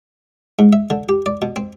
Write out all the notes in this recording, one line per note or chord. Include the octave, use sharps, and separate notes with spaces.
G#2
E5
D3
G4
D5
B2
C4